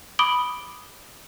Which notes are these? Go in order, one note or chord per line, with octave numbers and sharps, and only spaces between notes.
B5 D6 D#6 D7 F#7 G7